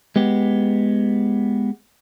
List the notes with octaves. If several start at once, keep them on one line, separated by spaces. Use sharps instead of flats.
G#3 B3 G4